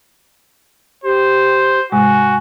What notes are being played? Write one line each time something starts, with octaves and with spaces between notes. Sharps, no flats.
G4 C5
G#2 C3 G#3 F#4 G#5